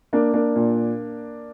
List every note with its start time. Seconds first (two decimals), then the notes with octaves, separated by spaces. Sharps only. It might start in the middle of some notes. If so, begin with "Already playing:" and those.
0.13 A#3 D4
0.33 A#3 D4
0.55 A#2